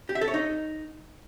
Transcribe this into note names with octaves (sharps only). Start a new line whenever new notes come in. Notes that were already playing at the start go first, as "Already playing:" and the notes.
G4
E5
A4
C#5
D#4